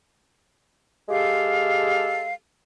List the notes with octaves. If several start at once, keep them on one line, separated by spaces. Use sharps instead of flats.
G#3 G4 A4 F5